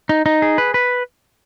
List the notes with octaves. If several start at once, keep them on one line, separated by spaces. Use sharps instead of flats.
D#4
D#4
G#4
B4
B4